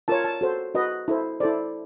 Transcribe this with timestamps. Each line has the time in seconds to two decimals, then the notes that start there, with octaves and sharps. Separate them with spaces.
0.08 F4 A#4 C#5 A5
0.24 A5
0.41 F#4 A4 C5
0.75 F#4 B4 D#5
1.08 E4 A4 C5
1.40 E4 A4 C5 D5